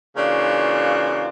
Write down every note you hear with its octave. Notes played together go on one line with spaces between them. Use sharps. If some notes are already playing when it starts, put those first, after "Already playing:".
C#3 E3 A#3 D4 F4 F#4